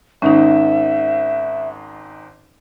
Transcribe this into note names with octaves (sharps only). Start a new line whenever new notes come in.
G#1 G#2 C#4 D#4 E5